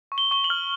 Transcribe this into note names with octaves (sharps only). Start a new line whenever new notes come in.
C#6
G7
C#6 G7
F#7
F6